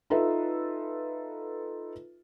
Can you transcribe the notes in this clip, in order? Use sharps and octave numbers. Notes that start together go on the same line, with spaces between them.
D#4 F4 A4 B4 E5